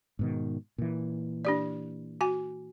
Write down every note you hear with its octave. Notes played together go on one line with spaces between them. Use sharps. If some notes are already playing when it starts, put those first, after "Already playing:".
G#2 B2 D#3
A#2 E3
D4 G4 D5
F#4 G#5